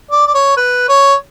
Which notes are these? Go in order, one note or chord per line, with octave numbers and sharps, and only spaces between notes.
D5
D5
C#5
B4
C#5